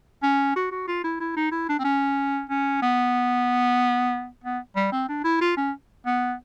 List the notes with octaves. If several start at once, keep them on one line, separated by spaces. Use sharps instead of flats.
C#4
F#4
F#4
F4
E4
E4
D#4
E4
D4
C4
C#4
C#4
B3
B3
G3
C4
D4
E4
F4
C#4
B3